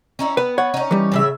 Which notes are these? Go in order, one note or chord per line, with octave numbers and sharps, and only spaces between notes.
C#4 D#4 E4
B3 B4
C#5 F#5
C#4 D#4
E3 G3
A2 C#3 E5